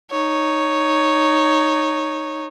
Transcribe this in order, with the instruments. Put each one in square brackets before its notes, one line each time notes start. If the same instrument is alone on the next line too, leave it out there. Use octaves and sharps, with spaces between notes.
[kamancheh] D#4 C#5